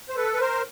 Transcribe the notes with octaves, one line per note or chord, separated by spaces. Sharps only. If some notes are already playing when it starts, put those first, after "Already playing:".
C5
A4 B4
B4
A#4 C5